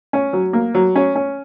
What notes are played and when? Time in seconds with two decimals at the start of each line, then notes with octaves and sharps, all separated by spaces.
0.13 C#4
0.33 F#3
0.53 A#3
0.74 F#3
0.96 C#4
1.15 C#4